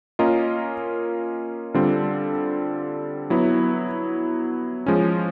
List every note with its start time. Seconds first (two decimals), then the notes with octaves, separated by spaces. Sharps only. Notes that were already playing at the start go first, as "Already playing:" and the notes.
0.19 A#3 C#4 F4 A#4 D#5
1.74 D3 G3 C4 F4
3.30 F#3 B3 E4
4.86 F3 G#3 C#4